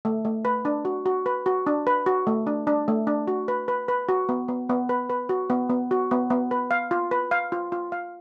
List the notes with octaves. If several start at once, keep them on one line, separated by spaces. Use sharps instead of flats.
A3
A3
B4
D4
F#4
F#4
B4
F#4
D4
B4
F#4
A3
D4
D4
A3
D4
F#4
B4
B4
B4
F#4
B3
B3
B3
B4
B4
F#4
B3
B3
F#4
B3
B3
B4
F5
F4
B4
F5
F4
F4
F5